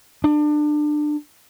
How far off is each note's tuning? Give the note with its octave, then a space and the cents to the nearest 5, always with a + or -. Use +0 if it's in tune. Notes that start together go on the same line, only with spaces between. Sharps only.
D4 +25